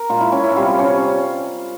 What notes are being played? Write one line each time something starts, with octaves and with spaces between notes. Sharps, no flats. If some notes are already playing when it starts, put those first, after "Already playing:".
Already playing: A#4
A#2 G#3 F4
E4
C#4
E4
C3 G3 F4
C#4